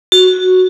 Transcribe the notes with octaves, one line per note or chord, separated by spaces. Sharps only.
F#4